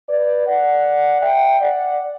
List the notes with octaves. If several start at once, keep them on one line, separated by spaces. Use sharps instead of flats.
B4 D5
D5 F#5
E5 G5
D5 F#5